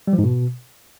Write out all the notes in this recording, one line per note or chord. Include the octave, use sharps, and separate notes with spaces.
G3
F3
G#2
B2